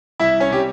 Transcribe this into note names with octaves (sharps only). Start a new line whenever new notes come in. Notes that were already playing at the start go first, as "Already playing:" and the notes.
C2 E4 E5
C#4 C#5
C3 G3 G4